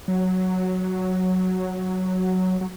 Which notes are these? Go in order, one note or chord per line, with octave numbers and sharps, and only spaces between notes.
F#3
F#3